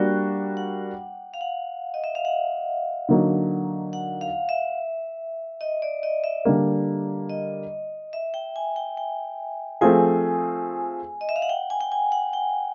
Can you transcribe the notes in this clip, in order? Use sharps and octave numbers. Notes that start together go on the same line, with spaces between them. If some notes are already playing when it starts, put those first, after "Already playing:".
Already playing: G3 A#3 D4 F#4 G5
F#5
F5
F#5
D#5
E5
F5
F#5
D3 F#3 A#3 D#4
F#5
F5
E5
D#5
D5
D#5
E5
D3 G3 A#3
D#5
E5
G5
G#5
G5
G5
F3 A3 C4 F4 G#4 G#5
D#5
E5
F5
F#5
G5
G#5
G5
G#5
F#5
G5